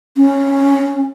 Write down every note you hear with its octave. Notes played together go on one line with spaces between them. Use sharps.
C#4